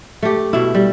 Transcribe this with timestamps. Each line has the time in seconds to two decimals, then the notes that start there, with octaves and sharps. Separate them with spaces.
0.23 A3 G4
0.53 B2 E4
0.75 G3